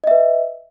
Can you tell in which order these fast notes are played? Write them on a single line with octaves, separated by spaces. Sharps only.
D#5 E5 B4